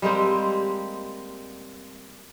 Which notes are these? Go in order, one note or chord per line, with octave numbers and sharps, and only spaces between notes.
G3 G#3 A#3 C4